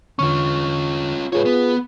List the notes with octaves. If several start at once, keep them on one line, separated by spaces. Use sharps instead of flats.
E2 D3 C#4 F4 C#6
G#2 F4 G#4 B4 C#5
B3